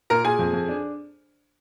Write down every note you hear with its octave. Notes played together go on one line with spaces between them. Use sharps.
A#2 A#4 A#5
A#2 G#4 G#5
F2
F2
D4